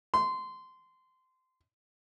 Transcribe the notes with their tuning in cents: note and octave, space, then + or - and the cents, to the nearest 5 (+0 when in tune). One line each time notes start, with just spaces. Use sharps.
C6 -20